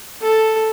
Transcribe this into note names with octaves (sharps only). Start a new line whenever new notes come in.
A4